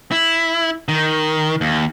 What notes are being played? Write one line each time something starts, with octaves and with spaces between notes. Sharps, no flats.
E4
D#3
D#2